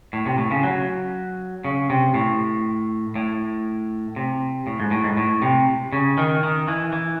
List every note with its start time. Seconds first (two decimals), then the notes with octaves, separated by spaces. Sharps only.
0.13 A2
0.26 C3
0.38 A2
0.51 C#3
0.63 F#3
1.65 C#3
1.90 C3
2.14 A2
3.16 A2
4.16 C3
4.67 A2
4.80 G#2
4.91 A2
5.04 G#2
5.17 A2
5.42 C3
5.93 C#3
6.18 D#3
6.43 D#3
6.68 E3
6.93 E3